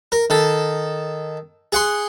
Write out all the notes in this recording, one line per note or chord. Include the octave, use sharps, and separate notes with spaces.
A#4
D#3 A4
G#4 F#5 C6